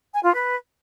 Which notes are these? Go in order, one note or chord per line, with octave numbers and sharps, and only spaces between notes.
G#5
F4
B4